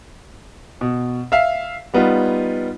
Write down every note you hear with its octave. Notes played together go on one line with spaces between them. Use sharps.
B2
E5 F5
G3 B3 D#4 F4